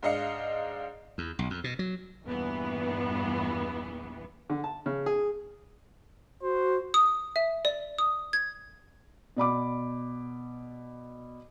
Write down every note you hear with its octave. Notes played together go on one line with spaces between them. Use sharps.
G#2 D4 D#5 F5 C#7
E2
B1
F2
B2
F#3
E2 G2 A#2 E3 B3
D3
A5
C#3
G#4
F#4 C5
D#6
E5
D5
D#6
G#6
B2 D5 B5 D6